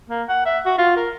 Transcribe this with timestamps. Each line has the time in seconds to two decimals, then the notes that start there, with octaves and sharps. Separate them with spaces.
0.10 A#3
0.29 F#5
0.46 E5
0.66 F#4
0.78 F4
0.97 A#4